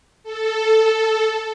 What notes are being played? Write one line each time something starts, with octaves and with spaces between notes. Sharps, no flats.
A4